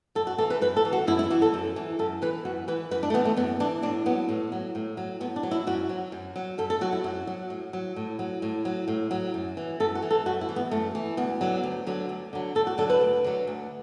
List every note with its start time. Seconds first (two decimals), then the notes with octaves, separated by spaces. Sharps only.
0.15 F#2 A4
0.27 F#4
0.38 E3 A4
0.50 B4
0.61 F#2 B4
0.77 A4
0.85 E3
0.93 F#4
1.07 F#2 E4
1.19 E4
1.30 E3 F#4
1.42 A4
1.54 F#2
1.76 E3
1.99 F#2 A4
2.22 E3 B4
2.45 F#2 F#4
2.68 E3 B4
2.91 F#2 B4
3.03 D4
3.10 A3
3.14 E3 B3
3.25 A3
3.37 F#2 B3
3.60 E3 D4
3.83 A2 D4
4.06 F#3 B3
4.29 A2
4.52 F#3
4.75 A2
4.97 F#3
5.21 A2 B3
5.36 D4
5.43 F#3
5.51 E4
5.67 F#2 F#4
5.89 F#3
6.12 F#2
6.36 F#3
6.58 F#2 A4
6.70 A4
6.81 F#3 F#4
6.92 E4
7.04 F#2 F#4
7.27 F#3
7.50 A2
7.73 F#3
7.96 A2
8.19 F#3
8.42 A2
8.65 F#3
8.88 A2
9.11 F#3
9.34 F#2
9.57 E3
9.80 F#2 A4
9.95 F#4
10.02 E3
10.11 A4
10.26 F#2 F#4
10.41 E4
10.49 E3
10.56 B3
10.71 F#2 A3
10.95 E3
11.17 D2 B3
11.41 D3 F#3
11.63 D2
11.87 D3 F#3
12.09 D2
12.33 D3 F#3
12.55 D2 A4
12.67 F#4
12.78 D3 F#3 A4
12.90 B4
13.01 D2
13.24 D3 F#3
13.47 D2